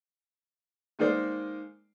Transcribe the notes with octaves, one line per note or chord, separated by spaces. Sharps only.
D#3 G#3 A#3 D#4 C5 D5